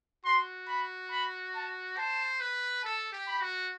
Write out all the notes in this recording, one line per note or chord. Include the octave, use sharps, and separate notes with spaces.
F#4 C6
B5
B5
A5
C5 A5
B4
A4 A5
G4
B5
F#4